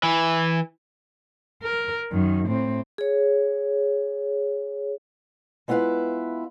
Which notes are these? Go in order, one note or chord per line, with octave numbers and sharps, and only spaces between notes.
E3
A#4
F#2 D#3
A2 C4
G#4 C#5
G#3 B3 E4 F4 B4 F5